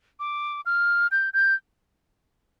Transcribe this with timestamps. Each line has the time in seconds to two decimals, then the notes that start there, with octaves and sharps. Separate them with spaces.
0.20 D6
0.66 F6
1.11 G6
1.33 G6